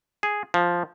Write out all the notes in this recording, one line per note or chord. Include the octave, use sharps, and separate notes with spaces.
G#4
F3